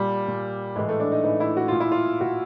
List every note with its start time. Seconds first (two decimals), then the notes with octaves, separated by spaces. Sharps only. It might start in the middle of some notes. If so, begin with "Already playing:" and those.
Already playing: A#2 G3
0.28 A#2
0.76 A2 E3 G#3
0.89 A3
1.00 D4
1.12 D#4
1.24 A2 E3 D#4
1.40 E4
1.57 F#4
1.68 A#2 F4
1.80 E4
1.92 F4
2.21 A#2 F#4